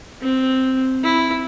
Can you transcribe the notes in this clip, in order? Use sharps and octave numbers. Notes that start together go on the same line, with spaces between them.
C4
E4